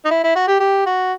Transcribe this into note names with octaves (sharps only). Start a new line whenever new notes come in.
D#4
E4
E4
F#4
G4
G4
F#4